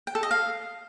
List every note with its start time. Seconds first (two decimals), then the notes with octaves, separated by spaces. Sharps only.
0.07 G5
0.15 A4
0.23 D#5
0.31 F5